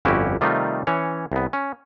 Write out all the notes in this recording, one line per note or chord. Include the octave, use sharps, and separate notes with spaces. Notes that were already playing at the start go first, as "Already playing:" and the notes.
G1 F2 C#4 E4 F#4 G4
C3 D#3 G3 A3 D#4 F4
E3 C#4 C#5
C2 B3
C#4